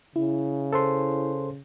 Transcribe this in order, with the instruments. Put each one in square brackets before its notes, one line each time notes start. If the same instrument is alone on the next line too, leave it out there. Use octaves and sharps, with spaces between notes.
[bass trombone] C#3 [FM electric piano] E4
[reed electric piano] A4 C5 C6